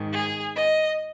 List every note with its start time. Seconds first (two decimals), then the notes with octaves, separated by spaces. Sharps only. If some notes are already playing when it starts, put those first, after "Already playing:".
Already playing: G#2 D#3
0.12 G#4
0.54 D#5